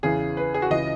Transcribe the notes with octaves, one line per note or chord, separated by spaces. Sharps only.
E2 C#3 E3 G#4
B4
G#4
F#4
C#2 C#3 E3 D#5